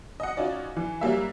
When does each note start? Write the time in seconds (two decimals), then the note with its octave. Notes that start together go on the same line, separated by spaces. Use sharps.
0.20 D#5 F#5
0.37 C#4 D#4 F4 F#4 D5
0.76 E3
1.01 F#3 G3 A#3 E5